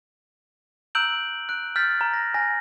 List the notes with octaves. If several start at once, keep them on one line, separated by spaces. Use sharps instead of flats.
A#5 E6 F#6 G6 D7 F#7
F#6 D7
F6 G6 A6 B6
A#5
A#6
G#5 F6 A#6